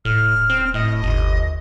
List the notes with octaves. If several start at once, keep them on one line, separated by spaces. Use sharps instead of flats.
D#1 A2 F6
C4
A2 D#5
G1 D#2